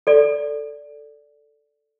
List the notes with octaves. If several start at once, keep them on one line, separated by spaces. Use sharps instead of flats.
A4 D5